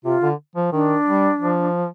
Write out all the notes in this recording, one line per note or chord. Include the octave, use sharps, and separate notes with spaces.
C3 F4
D3
F3
D#3 D4
G3
F3